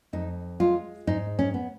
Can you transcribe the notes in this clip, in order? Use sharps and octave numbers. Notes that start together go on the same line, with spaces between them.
F2 D#4
G#3 F4
G#2 D#4
C#4
B3